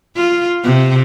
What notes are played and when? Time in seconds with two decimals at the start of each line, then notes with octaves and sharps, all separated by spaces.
0.16 F4
0.64 C3